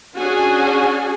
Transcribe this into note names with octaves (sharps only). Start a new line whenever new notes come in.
C#4 D4 F#4 G#4 G#5